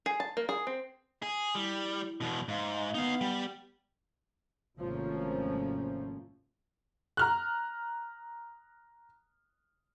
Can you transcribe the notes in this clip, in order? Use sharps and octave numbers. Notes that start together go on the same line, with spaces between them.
G#4
A5
A#3
G#4
C4
G#4
G3 E4
E2 B2
G#2 F5
B3 D#4 F5
G3
G#1 C3 F3 A3 A#3 C#4
A#5 F6 F#6